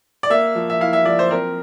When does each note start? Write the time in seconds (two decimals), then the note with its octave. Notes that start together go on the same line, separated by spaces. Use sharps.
0.23 D5
0.30 A#3 E5
0.55 F3
0.70 E5
0.81 E4 F5
0.93 E5
1.05 F3 D5
1.19 C5
1.30 C4 A#4